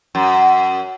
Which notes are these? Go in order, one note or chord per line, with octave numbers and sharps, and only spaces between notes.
F#2